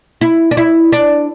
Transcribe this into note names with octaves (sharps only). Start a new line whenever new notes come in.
E4
D4
E4
D4